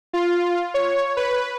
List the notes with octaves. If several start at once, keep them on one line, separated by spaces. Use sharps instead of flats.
F4
C#5
B4